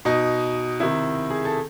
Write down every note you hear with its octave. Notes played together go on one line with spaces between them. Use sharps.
B2 D#4
C3 D#3 E4
G#4
A4